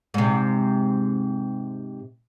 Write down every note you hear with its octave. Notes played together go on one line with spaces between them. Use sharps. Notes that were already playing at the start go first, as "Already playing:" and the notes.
G#2 C3